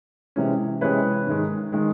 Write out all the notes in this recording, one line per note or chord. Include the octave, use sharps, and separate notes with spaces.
C3 E3 G#3 C#4
C3 E3 G#3 C#4 B4 C#5
G#2 D#3 G#3
D#3 G#3